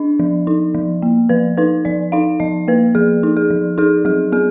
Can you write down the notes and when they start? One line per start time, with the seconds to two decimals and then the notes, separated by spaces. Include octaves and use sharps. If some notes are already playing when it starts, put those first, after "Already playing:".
Already playing: D4 D#5
0.20 F3
0.47 D#4
0.75 F3
1.02 A#3
1.29 F3 B4
1.58 D#4 B4
1.85 F3 D5
2.12 D#4 F5
2.40 F3 D#5
2.68 A#3 B4
2.95 F3 G#4
3.23 D#4
3.37 G#4
3.50 F3
3.78 D#4 G#4
4.05 F#3 G#4
4.32 B3 G#4